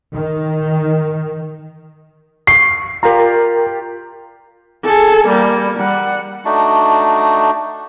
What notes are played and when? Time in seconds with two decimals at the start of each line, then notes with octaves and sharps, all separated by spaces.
0.15 D#3
2.47 C#6 C7
3.03 F4 G4 A#4 D5 A#5
4.85 G#4 A4
5.28 G3 A#3
5.78 G3 F#5
6.45 A3 D4 D#4 F#4